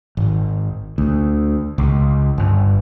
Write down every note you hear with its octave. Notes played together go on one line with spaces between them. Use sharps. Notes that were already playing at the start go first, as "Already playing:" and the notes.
G#1
D2
C#2
G1